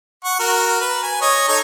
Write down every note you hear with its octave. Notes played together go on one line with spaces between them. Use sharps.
F#5 C#6
F#4 A#4
B4
G#5
C#5 D#5
D#4 A4 C#5